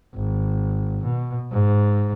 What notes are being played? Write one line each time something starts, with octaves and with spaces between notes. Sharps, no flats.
G#1
B2
G#2